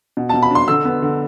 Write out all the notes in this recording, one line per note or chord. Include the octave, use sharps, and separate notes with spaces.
B2
A5
B2
B5
D4 C6
D3 E6
B3
D3